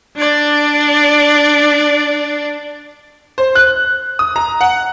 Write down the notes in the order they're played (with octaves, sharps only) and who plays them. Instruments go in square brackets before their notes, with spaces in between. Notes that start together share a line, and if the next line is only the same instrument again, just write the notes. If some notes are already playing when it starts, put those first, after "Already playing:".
[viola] D4 D5
[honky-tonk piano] C5
F#6
D#6
A#5
F#5